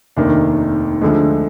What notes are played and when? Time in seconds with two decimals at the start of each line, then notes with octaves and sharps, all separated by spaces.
0.17 F1 D#2 D#3 D4
1.02 D2 D3 F3 G#3